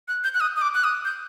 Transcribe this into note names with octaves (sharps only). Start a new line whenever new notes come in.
F#6
G6
F#6
D#6
D#6
D6
F#6
D#6
G6